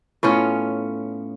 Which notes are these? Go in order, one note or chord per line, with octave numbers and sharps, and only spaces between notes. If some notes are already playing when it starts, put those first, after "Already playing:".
A2 B3 C#4 F4